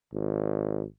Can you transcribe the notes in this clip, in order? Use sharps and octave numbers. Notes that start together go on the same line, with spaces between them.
G#1